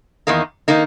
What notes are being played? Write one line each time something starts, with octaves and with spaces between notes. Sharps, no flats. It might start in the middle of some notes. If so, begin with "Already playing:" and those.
E2 D#3 A#3 D#4
D#3 A#3 D#4